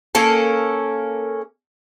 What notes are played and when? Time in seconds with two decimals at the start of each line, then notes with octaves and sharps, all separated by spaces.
0.15 A#3 C#4 A4